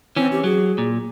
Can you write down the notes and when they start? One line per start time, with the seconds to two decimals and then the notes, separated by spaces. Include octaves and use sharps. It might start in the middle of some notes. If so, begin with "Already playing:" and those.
0.16 E3 C4 C#4
0.32 G4
0.44 F#3 G#4
0.78 A#2